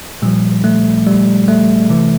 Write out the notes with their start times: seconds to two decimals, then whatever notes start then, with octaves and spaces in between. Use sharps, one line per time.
0.22 A#2 F3 G3
0.64 A3
1.06 G3
1.48 A3
1.89 C3 E3